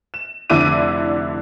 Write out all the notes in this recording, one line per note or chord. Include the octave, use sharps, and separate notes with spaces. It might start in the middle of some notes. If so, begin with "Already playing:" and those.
E7
F1 D3 D4 E4 D6 D#7